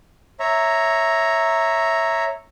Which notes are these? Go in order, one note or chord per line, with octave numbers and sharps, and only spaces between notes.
C#5 E5 A#5